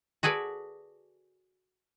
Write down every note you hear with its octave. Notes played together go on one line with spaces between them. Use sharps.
F#4 G#4 A4 B4 D5